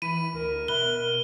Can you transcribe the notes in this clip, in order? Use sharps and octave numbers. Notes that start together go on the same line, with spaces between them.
E3 B5 D#7
D2 A#4
B2 E5 B5 F#6 G7